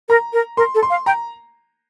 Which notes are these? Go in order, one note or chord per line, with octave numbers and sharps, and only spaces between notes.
A#4 A#5
A#4
A#4 C6
A4
C6
F5
G5 A#5